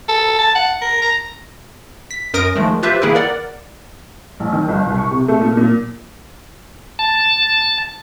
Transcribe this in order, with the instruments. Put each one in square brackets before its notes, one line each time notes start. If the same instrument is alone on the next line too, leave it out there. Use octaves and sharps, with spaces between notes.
[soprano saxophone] A4
A5
F#5
A#4
A#5
[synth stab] B6
F#2 A#4 D#6 A#6 D7
D#3 F3 G#3 A3
F4 G4 B4 C5 E5
D#3 A#3 E4 G#4 A#4 B4
A#4 D5 F#5
[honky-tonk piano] A1
D#3
G1
C2
C#6
C3
A3
A#2
A#2
[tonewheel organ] A5